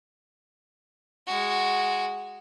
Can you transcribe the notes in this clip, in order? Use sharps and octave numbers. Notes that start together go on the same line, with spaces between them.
G#3 F#4